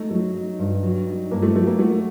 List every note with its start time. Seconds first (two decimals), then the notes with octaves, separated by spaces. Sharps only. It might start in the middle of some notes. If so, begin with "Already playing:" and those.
Already playing: A3 D#4
0.10 F#3 A3
0.35 D#4
0.59 G2
0.83 F#3
1.07 D#4
1.31 G2 A#3
1.42 A3
1.55 F#3 A3
1.67 A#3
1.79 A3 F#4